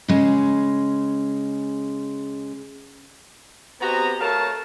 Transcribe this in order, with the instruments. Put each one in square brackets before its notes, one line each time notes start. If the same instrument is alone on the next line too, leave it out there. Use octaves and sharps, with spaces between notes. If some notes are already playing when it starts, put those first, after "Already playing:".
[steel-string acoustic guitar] C#3 G#3
[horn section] B3 C4 F#4 G4 D#5 A#5
A3 A#4 C#5 F5 A5